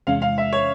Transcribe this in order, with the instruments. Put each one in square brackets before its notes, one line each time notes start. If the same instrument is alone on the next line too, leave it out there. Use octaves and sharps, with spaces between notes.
[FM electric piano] E2 C3 E3 G#3 C#4 [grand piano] F5
[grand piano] F5
E5
C#5